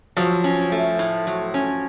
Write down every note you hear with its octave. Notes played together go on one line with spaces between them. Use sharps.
F3 F#3
C#4
A3
A2
F#3
C#4